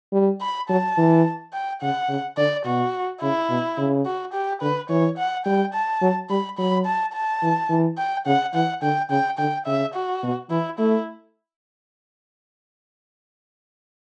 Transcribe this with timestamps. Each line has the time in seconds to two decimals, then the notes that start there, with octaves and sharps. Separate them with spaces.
0.12 G3
0.41 B5
0.69 F#3 A5
0.98 E3
1.53 G5
1.81 C#3 F#5
2.09 C#3
2.37 D3 D5
2.65 B2 F#4
3.22 C#3 E4
3.49 B2
3.77 C#3
4.05 F#4
4.33 G4
4.61 D3 B4
4.89 E3 C#5
5.18 F#5
5.46 G3 G5
5.74 A5
6.01 F#3
6.30 G3 B5
6.58 F#3 B5
6.86 A5
7.14 A5
7.43 E3
7.69 E3
7.98 G5
8.26 C#3 F#5
8.54 E3 F#5
8.82 D3 G5
9.10 C#3 G5
9.38 D3 G5
9.66 C#3 E5
9.94 F#4
10.23 B2
10.50 E3 E4
10.79 A3 E4